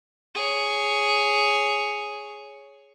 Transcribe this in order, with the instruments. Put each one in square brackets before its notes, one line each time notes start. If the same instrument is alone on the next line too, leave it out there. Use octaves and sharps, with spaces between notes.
[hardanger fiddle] G#4 C#5